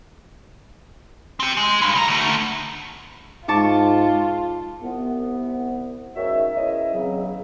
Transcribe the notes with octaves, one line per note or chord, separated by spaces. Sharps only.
C4 G4
G#3
G2
C#2 A#5
D3 A3
G#2 D#4 F4 A5 C#6 D6
C2 B3
G#2 D#3 F#3 C#4 E5
E2 C#4 E4 D#5 E5
E2 C#3 F#3 C4